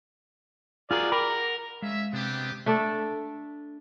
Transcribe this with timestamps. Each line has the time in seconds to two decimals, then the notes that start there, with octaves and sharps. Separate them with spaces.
0.91 F4 F#4 G#4 A#4 D5
1.12 A#4 G5 B5 D6
1.30 F#5
1.82 G#3 C#4 E5 F5
2.13 C3 B3 D4 G4
2.66 A3 D4 A4 D5